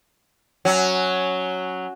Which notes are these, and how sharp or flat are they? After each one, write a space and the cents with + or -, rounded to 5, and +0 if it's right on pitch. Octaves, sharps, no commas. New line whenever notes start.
F#3 +0 C#4 +0